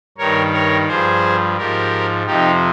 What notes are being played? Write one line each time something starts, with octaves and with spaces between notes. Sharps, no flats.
G2 D#3 A#4 C#5
A#4 C#5
G2 F3 G#4 C5
G#2 F3 G4 A#4
F2 C3 F3 D#4 G4